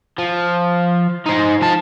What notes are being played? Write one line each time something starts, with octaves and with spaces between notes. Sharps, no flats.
F3
D#4 C5
F3 A5